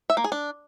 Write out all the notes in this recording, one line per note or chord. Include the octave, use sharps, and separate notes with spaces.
E5
A#3
G#4
D4